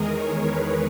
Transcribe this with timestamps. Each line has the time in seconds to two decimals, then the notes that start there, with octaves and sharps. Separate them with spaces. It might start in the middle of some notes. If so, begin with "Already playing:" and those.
Already playing: E2 D#3 G#3 G#4 A#4
0.09 C#5
0.42 B4